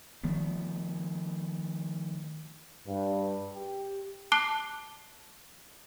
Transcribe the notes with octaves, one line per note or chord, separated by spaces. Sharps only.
D#3 F3 A3 B3
G2
G4
A5 D6 F#6 C7 G7